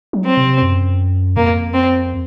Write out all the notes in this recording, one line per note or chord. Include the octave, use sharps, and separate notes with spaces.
F#3
C4
C3
F#2
F2 A#3
C4